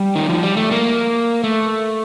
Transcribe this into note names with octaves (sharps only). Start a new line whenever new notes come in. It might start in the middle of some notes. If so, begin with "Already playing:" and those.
Already playing: G3
D#3
F3
G3
A3
A#3
A3